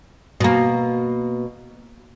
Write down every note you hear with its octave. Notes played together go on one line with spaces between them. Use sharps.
B2 A#3